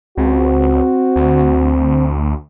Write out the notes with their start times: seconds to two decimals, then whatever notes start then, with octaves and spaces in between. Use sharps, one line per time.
0.17 C#2 C4 F#4
1.16 D2